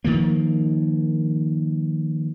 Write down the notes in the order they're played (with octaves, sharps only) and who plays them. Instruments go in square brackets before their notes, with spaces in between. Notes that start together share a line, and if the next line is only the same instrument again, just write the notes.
[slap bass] D#3 F3 A#3